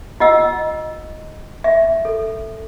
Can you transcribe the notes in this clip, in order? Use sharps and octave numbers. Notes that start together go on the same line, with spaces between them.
F4 D#5 F#5 E6
E5
A4